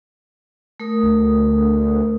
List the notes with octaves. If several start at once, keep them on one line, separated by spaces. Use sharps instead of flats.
A3 A#4 D#6
D2